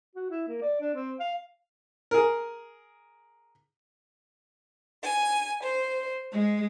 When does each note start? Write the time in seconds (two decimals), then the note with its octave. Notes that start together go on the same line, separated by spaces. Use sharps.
0.15 F#4
0.30 E4
0.48 A#3
0.62 D5
0.81 D4
0.95 C4
1.20 F5
2.11 G#4 A#4
5.02 G#5
5.62 C5
6.31 G#3